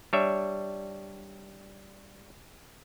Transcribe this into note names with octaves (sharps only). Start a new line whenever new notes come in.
G3 D4 C#5 E5